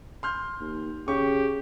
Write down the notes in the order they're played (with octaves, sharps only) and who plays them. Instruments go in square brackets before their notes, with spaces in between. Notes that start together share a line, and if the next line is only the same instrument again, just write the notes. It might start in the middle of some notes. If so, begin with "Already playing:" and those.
[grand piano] C6 F6 G6
[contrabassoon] D#2
[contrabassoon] C#3 [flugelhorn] G4 [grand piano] C#6